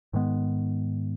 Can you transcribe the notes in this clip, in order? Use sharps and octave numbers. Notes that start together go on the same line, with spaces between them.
G#2 D#3 G#3 B3